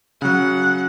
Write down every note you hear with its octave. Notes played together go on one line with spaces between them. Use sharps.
C#3 F#3 F#5